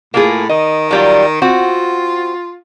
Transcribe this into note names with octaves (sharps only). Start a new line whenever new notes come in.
A2 A#3 F4 G#4
D#3 D#5
F#3 G3 F4
C4 F4 F#4